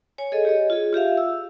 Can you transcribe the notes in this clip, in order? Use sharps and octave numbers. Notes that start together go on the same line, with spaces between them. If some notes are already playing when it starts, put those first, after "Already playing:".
C#5 G#5
G#4 A4 D#5
G4 C#5 D#5
F4 G#4
F4 G4 E5 F5
E6